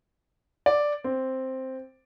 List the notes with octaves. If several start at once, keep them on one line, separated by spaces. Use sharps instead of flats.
D5
C4